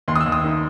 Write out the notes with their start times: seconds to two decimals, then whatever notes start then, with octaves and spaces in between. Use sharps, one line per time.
0.08 D#2 C6
0.16 D#6
0.20 E6
0.26 D#2
0.32 D#6
0.44 D#3